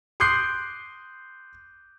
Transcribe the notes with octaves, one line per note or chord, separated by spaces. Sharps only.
C6 D6 D#6 F#6 G6 C7